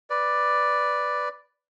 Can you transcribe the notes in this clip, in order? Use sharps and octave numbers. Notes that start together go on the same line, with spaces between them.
B4 D5